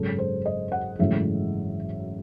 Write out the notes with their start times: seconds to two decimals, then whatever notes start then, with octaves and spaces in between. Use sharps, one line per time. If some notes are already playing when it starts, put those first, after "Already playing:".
Already playing: G#1 F#2 C#3 A4
0.19 C5
0.46 D#5
0.72 F#5
0.99 G#1 F#2 C#3 E3 A3 E5